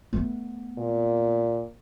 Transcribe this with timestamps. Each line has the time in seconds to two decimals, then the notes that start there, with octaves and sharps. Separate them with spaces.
0.13 A3 B3
0.78 A#2